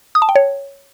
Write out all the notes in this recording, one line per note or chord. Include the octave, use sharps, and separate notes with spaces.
D#6
A5
G5
C#5